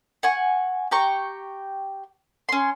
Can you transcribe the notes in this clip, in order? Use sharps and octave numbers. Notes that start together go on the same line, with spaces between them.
F#5 G#5 C#6
G4 G5 A#5 C#6
C#4 C6